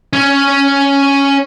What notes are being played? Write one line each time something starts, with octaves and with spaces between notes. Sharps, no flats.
C#4 C#5